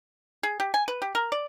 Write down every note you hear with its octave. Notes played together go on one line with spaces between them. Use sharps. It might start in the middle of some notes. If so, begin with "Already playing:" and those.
G#4
G4
G#5
B4
G4
A#4
D5